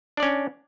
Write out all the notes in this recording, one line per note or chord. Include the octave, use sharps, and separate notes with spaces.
C#4 D4 D5